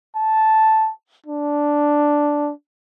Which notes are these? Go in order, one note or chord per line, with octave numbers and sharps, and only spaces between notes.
A5
D4